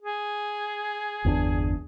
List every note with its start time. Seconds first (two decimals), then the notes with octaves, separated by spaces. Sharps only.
0.01 G#4
1.24 G1 E2 D4